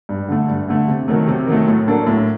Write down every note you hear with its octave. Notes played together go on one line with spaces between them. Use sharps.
G2
D3 A3
G2
D3 A3
C3
D#3 F#3 A3
C3
D#3 F#3 A3
A2
F#3 A#3 D4 A4
A2